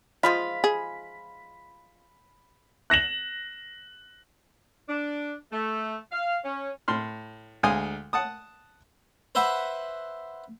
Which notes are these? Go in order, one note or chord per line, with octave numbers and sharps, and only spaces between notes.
F3 G#3 F4 B5
G#4
F#6 A#6 E7 F#7
D4
A3
F5
C#4
A2 C6 F6
D2 G#3 F5 G#5 D#6
F#5 A5 D#6
B4 C5 E5 F#5